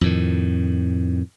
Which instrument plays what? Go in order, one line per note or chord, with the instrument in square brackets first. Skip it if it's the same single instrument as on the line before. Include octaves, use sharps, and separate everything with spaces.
[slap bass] F2 A2 D#3